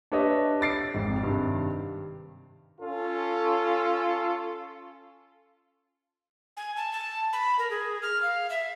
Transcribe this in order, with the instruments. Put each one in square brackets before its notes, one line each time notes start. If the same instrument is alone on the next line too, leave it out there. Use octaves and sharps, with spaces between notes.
[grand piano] D4 G4 B4 C#5 D#5 E5
D6 A6 C7 D7
G#1 F2 G#2
G2 C3 D#3
[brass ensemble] C#4 F4 A4
[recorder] G#5
A5
A5
B5
A#4
G#4
F6
F5
E5